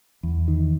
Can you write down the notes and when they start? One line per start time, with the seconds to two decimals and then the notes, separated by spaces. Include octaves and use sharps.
0.23 E2
0.48 D#3